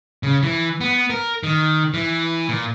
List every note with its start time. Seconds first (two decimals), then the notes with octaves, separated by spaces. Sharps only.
0.23 C#3
0.43 E3
0.81 B3
1.10 A#4
1.43 D#3
1.94 E3
2.48 A#2